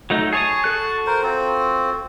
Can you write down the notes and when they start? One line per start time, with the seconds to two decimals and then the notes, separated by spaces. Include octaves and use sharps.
0.10 F#3 A3 D#4
0.33 G#4 C#5 A5 D#6
0.64 F#4 A4 F#6
1.06 A#4 C5
1.23 C4 F4